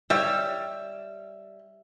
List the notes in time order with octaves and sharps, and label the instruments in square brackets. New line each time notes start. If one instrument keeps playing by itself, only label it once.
[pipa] G3 C#5 [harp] E5